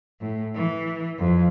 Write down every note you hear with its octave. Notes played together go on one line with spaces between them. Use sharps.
A2
E3
F2